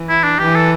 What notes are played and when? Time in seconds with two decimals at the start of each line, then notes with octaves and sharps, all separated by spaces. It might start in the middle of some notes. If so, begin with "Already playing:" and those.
Already playing: E3
0.09 E4
0.23 D4
0.39 E3 G4
0.55 A4